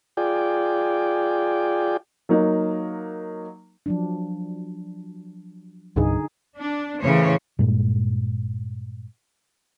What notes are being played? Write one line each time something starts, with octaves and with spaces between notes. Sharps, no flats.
F4 G#4 D5 G5
F#3 A#3 D#4
F3 F#3 D4
C2 G2 D3 D#4 G#4
D4
A2 C#3 E3 C5 C#5
G2 A#2 G#3